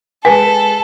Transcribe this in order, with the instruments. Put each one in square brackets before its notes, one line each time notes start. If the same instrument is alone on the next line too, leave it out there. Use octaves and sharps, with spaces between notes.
[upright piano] G#3 B4 B6 [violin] A4 [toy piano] G#5